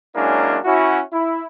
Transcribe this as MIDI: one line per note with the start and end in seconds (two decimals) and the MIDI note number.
0.15 0.57 54
0.15 0.57 56
0.15 0.57 58
0.15 0.57 61
0.15 0.57 62
0.15 0.57 64
0.65 0.99 61
0.65 0.99 64
0.65 0.99 66
1.13 1.44 64